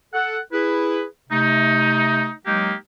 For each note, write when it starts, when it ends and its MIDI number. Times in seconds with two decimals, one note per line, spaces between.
0.14 0.39 69
0.14 0.39 78
0.53 1.04 64
0.53 1.04 68
0.53 1.04 71
1.30 2.30 48
1.30 2.30 57
1.30 2.30 63
2.46 2.73 54
2.46 2.73 56
2.46 2.73 58
2.46 2.73 63
2.46 2.73 67